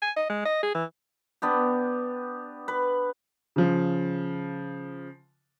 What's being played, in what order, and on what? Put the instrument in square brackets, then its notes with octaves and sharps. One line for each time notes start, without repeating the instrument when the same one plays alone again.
[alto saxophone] G#5
D#5
G#3
D#5
G#4
E3
[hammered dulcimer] B3 D4 G4
B4
[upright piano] C#3 F3